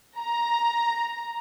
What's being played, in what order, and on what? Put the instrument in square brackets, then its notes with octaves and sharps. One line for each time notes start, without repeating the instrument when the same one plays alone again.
[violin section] A#5